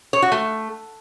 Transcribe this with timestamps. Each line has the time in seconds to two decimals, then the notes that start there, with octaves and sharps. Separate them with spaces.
0.13 C#5
0.22 F#4
0.32 A3